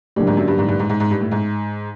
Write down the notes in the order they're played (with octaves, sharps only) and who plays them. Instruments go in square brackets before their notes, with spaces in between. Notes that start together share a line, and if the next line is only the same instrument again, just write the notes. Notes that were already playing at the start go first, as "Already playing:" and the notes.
[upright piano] A2 [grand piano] D3 F#3 A#3 D4 G4
[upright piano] G#2
F#2
G2
G#2
G2
G#2
G#2
G#2
G2
A2
G#2